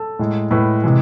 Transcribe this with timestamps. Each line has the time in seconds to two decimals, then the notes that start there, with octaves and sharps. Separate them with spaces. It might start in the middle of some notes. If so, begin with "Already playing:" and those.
Already playing: A4
0.19 A2 G#3
0.51 A2 G#3 B4
0.84 C3 E3 G#3